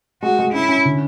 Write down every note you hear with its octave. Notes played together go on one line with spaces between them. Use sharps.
G#3 F#4
G#3
C#4 E4
C#4
D3